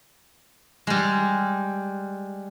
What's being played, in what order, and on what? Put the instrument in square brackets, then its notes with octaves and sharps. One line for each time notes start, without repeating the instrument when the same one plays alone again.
[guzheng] G3 G#3